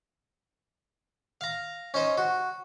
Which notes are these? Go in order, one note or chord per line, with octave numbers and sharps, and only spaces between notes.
F5 A#5
C#4 D#4 C5
F#4